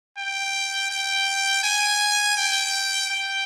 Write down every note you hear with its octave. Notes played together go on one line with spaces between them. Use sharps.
G5
G5
G#5
G5
G5